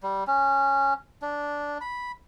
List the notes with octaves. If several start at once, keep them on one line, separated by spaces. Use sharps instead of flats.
G3
C#4
D4
B5